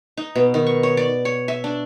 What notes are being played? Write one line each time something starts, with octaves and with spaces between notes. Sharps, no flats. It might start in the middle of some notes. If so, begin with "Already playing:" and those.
D#4
B2
D#3
C#6
C#5
D5
C#5
E5
D4